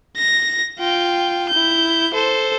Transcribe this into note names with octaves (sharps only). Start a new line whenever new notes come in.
A#6
F4 G5
E4 G6
A4 C5